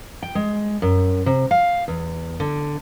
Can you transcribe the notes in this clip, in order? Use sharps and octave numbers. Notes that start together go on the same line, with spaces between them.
G5
G#3
F#2
C3
F5
E2
D3